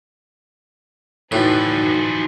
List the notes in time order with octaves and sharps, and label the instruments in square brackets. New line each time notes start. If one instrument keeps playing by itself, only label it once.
[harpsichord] A2 [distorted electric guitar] E3 F3 [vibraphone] D#4 F#4 [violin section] B4 D5